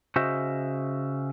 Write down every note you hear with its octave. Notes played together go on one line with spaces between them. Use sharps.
C#3 F#4 C5 D#5 E5